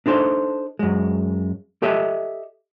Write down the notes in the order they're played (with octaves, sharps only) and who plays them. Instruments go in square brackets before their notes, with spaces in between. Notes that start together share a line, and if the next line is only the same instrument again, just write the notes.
[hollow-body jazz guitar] D4 D#4 A4 C5
F#2 G#3
G4 A4 D#5 E5